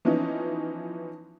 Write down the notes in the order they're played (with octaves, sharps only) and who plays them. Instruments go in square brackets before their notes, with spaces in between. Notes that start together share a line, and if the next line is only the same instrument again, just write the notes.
[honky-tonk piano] E3 F3 B3 C#4 D#4